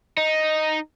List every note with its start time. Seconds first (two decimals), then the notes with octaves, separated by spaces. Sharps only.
0.18 D#4